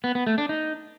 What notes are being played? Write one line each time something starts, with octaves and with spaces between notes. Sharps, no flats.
B3
B3
A3
D4
D#4